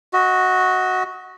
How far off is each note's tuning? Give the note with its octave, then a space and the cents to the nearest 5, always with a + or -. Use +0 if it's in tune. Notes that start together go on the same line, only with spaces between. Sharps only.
F#4 +0 D#5 +35